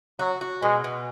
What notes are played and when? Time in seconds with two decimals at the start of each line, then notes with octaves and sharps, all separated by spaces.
0.19 F#3 F#4
0.41 F#4
0.62 B2 G#3
0.84 B2